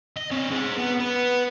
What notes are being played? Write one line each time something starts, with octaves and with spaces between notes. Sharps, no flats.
D#5
C4 C#5
G#4 C5
B3
B3